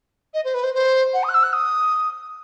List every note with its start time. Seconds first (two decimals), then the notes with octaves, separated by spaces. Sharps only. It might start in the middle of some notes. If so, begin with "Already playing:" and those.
0.34 D#5
0.44 C5
0.54 B4
0.63 C5
0.74 C5
1.13 F#5
1.23 D#6
1.29 F#6
1.34 E6
1.43 F#6
1.53 D#6